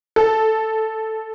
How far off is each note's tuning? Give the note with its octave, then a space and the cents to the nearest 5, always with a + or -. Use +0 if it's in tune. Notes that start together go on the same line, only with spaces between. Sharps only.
A4 -5